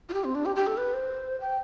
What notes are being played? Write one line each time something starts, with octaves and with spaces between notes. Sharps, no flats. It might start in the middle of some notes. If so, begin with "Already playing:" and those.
F4
G4
C4
D4
G4
G4
A4
B4
C5
G5